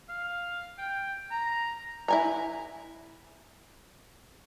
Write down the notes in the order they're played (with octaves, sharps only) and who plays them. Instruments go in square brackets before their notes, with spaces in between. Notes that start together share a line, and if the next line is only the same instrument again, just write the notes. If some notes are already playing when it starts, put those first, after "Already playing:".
[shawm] F5
G5
A#5
[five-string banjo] E4 G#5 A#5